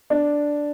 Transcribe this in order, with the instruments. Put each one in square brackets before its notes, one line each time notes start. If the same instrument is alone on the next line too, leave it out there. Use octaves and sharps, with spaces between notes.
[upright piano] D4